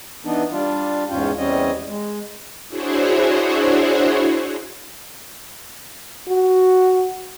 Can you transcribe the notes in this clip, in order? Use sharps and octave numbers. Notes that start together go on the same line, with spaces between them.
E3 B3 D4 D#4
G3 D4 F4
E2 G#2 C#4 F4 G5
E2 G3 C4 C#4 D#5
G#3
D4 E4 F#4 G#4 C5 C#5
F#4